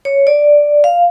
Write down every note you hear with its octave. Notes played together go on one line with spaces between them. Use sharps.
C#5
D5
F5